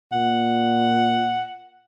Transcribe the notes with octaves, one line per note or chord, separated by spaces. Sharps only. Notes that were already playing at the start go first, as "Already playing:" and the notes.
A#2 F#5